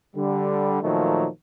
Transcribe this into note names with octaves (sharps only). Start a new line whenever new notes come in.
D3 G3
A#2 D#3 F3 F#3 A3